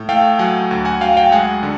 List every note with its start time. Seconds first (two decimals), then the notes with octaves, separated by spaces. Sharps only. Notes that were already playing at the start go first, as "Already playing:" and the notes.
Already playing: A2
0.09 A3 F5 G5
0.39 F#3 F#5 G#5
0.71 D2
0.85 F#5 G#5
1.01 F#3 F5 G5
1.16 F5 G5
1.31 G#3 F#5 G#5
1.63 D3